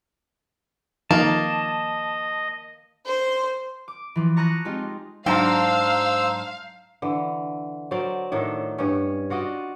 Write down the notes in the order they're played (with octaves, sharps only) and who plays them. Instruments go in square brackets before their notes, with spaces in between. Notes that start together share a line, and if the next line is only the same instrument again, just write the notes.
[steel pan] D#3 F3 D#4 [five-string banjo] A#3 [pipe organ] D#5 [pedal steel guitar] A5
[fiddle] C5
[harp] D6
E3 F3
A5 A#5 C#6 D#6 F#6 A#6
G#3 C4 D#4 F4 G4
[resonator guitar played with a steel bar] G#2 D4 G5 [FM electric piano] F#3 A#5 [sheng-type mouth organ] C5 E6 [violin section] F5
[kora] D3 E3
F#3 A#4 C5 D5
A2 D#3 D4 A4
G2 C#4
F4 F#4 D5 D#5